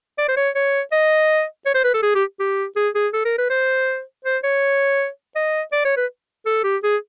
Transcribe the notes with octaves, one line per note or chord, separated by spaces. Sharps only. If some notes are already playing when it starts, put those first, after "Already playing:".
D5
C5
C#5
C#5
D#5
C#5
C5
B4
A4
G#4
G4
G4
G#4
G#4
A4
A#4
B4
C5
C5
C#5
D#5
D5
C#5
B4
A4
G4
G#4